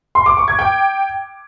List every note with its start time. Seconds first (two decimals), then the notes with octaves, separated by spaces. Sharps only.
0.15 C6
0.26 D6
0.37 C#6
0.48 G#6
0.59 G5